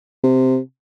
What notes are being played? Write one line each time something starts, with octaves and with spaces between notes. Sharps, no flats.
C3